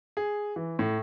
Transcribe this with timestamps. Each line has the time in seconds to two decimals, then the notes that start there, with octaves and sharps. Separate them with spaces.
0.17 G#4
0.56 E3
0.79 A2